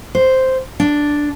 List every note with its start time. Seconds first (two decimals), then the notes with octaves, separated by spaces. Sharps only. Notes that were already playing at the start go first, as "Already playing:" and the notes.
0.15 C5
0.80 D4